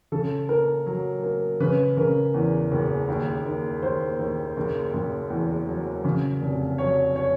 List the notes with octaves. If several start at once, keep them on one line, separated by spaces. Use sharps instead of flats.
C#3 A4
A#3 A#4
F#3
A#3
C#3 B4
C#3 A#4
E2
F#1
D#2
D#3
D#2 C5
D#2
F#1
F#1
E2
F#3
C#3
F1
F#3 C#5
C#5